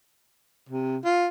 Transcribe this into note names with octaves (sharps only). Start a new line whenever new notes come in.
C3
F4